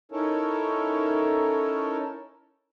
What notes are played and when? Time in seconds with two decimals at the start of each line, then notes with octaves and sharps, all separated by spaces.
0.12 C#4 D#4 E4 A4 A#4 C#5